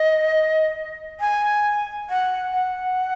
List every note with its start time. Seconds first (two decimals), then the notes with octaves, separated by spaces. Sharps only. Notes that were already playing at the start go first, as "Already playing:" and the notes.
Already playing: D#5
1.20 G#5
2.10 F#5
2.54 F#5